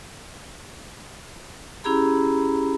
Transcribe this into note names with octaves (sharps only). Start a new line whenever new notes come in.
C#4 E4 G4 G#4 A#5 B5